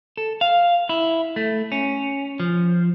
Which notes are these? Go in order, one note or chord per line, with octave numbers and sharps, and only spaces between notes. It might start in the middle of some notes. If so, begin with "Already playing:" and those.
A4
F5
E4
A3
C#4
F3